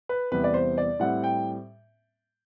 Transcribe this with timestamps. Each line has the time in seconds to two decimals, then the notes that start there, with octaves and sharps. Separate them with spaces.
0.09 B4
0.32 E2 C3 G3 B3 B4
0.44 D5
0.54 C5
0.78 D5
1.00 A2 G3 C4 F#5
1.24 G5